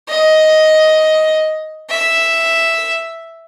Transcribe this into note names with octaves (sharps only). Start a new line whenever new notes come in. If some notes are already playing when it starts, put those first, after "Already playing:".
D#5
E5